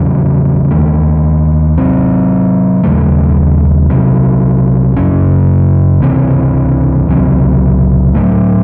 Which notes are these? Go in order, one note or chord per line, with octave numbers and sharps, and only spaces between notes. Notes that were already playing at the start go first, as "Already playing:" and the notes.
Already playing: E2 C#3 F#3
D#2 D#3 A3
C3 F#3 C4
D#2 C#3 F#3 A3
C2 C3 F#3
F#2 C#3 F#3 C#4
C#2 C3 E3 C4
C#2 C3 F#3 C4
A2 F#3 A3